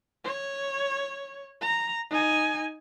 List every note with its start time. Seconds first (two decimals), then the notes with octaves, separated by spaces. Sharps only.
0.24 C#5
1.61 A#5
2.10 D#4 G#5